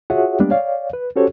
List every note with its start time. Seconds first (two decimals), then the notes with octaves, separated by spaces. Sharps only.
0.10 F4 F#4 G#4 C#5 E5 F#5
0.40 G3 G#3 A#3 B3 D4 G4
0.51 C#5 D5 F5
0.93 B4
1.16 C#4 F#4 G4 A4 C5 C#5